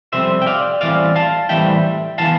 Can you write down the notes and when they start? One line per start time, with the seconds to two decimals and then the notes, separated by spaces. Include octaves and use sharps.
0.13 F2 C3 G3 C4 C5 E5
0.42 G5
0.46 D5 F5
0.81 A2 E3 G3 C4 D5 F5
1.16 F5 A5
1.49 A2 E3 G3 C4 E5 G5
2.18 E3 B3 F5 A5